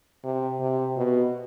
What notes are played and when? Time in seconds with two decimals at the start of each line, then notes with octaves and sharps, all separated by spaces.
0.24 C3
0.60 C3
0.97 B2